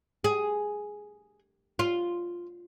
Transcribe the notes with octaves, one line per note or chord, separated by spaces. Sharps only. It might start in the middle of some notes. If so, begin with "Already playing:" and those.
G#4
F4